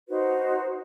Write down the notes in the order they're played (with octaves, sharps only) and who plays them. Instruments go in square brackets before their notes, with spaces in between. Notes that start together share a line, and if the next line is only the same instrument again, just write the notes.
[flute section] D#4 F#4 B4 C5